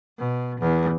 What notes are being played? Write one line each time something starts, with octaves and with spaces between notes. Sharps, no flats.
B2
E2